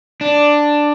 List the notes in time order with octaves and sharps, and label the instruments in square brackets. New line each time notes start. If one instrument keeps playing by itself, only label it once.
[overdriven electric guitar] D4